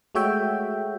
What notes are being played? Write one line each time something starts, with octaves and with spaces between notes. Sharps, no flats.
G#3 A3 F#4 C#5 E5 G5